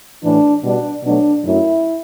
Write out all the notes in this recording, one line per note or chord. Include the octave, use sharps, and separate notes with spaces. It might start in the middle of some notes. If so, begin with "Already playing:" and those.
A2 E3 A3 D4
B2 G3 D4
B2 F#3 A3 D4
F#2 F#3 A3 E4